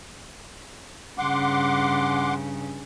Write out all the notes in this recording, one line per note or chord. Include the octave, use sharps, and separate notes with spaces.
G2 C#3 F#5 C6 D6